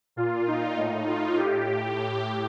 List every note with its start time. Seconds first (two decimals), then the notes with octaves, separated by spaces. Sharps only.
0.16 A#2 F4
0.47 D#4
0.77 A2
1.07 F4
1.37 A2 G4
1.97 A2